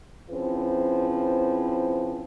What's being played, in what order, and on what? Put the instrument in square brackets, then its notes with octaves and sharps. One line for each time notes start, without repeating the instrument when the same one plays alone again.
[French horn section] C#3 F3 C4 C#4 E4 B4